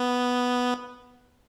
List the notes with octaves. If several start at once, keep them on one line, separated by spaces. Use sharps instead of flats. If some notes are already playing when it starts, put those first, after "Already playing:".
Already playing: B3